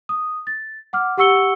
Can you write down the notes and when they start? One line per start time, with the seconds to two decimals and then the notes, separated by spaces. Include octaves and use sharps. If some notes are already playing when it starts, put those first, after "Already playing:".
0.09 D#6
0.47 A6
0.93 F#5 D6 F6
1.17 G4 F#5 C#6 E6 C#7 G7